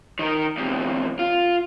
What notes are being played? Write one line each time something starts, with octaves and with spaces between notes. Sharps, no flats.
D#3 A#4
E2 C3
F4